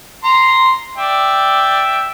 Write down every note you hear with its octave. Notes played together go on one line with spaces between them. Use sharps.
A#5 C6
D5 E5 G5